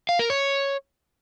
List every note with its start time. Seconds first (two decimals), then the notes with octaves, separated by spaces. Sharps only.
0.09 F5
0.19 A#4
0.30 C#5